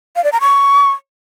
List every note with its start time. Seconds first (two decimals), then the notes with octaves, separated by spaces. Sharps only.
0.16 F5
0.24 D5
0.32 A#5
0.41 C#6